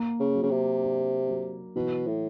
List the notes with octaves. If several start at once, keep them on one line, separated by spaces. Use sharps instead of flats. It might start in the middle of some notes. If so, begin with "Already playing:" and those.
Already playing: A#3
C#3
F#3
C#3
C3
D4
F#3
B2 E3
A2